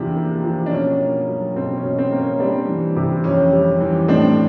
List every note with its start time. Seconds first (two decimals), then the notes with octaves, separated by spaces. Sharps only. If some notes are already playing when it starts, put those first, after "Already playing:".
Already playing: E2 C3 F3 A#3 D4
0.16 A#3
0.44 F3
0.66 D4
0.71 B2 C#4
1.00 A#3
1.28 F#3
1.56 B2 C4
1.77 C#4
1.84 B2
1.98 C4
2.12 A#3
2.19 C#4
2.40 G3 C4 D4
2.68 E3
2.96 C3
3.24 F2 C#4
3.53 G3
3.81 E3
4.08 A2 C4 D4